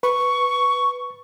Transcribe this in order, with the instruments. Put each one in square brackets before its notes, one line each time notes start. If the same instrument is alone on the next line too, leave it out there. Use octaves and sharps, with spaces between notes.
[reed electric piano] B4 [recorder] C#6